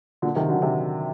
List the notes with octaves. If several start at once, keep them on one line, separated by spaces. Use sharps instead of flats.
A#2 D3
C3 D#3
D3 F#3
C3 D#3